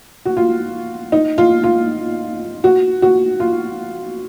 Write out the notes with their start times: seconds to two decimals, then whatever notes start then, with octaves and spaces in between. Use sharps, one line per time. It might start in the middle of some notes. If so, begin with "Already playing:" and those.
0.26 F#4
0.37 F4
1.12 D#4
1.38 F4
1.64 F4
2.64 F#4
3.02 F#4
3.40 F4